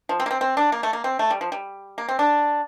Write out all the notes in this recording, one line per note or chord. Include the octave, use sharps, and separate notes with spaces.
F3
C4
A#3
C4
C4
D4
A#3
A3
A#3
C4
A3
G3
F3
G3
A#3
C4
D4